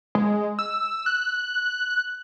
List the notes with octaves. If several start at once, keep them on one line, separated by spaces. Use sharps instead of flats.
G#3
E6
F#6